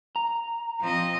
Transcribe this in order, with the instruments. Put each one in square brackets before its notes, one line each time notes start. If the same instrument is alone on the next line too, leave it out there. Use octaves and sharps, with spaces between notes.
[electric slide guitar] A#5
[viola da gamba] F3 C4 D#5